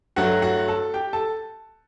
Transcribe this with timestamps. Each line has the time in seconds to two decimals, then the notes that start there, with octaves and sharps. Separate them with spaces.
0.16 G2 F#3 A3 F#4 F#5
0.42 F#4 F#5
0.68 A4 A5
0.94 G4 G5
1.13 A4 A5